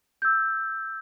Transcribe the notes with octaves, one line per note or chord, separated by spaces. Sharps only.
E6 G6